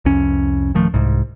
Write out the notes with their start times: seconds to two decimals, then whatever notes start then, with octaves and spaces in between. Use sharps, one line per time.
0.05 C2 F2 C#4
0.75 D1 D#3 F3 A3
0.94 C2 G#2